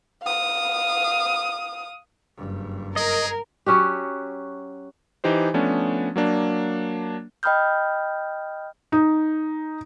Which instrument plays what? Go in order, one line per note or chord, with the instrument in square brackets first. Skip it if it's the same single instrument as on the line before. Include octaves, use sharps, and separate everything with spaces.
[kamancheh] F5 D#6
[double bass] F#1 G2
[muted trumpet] G#4 [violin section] A#4 [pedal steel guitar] D#5
[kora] F#3 C#4 F#4 G4
[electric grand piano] E3 D#4 G4 C5
F3 A3 B3 C#4 D4
F#3 A#3 D4
[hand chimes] D#5 G5 B5 D#6 F6 G6
[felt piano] D#4